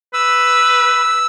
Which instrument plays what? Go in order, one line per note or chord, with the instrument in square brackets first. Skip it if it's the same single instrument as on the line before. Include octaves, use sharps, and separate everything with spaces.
[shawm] B4 [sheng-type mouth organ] E6